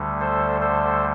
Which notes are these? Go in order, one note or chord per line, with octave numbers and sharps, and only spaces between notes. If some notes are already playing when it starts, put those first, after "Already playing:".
Already playing: D2 D3 G3
A4 C5
A4 C5